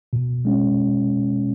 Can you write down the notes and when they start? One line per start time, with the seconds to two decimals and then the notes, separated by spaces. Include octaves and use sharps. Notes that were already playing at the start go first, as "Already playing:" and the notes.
0.13 B2
0.45 G#3 C#4